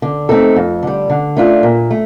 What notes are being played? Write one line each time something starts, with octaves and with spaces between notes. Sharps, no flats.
D3
A3 C4 D#4 A4
F2
D3 G3
D3
A3 D4 F4
A#2
A3